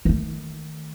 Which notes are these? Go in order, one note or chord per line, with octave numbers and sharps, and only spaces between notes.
D#3 A3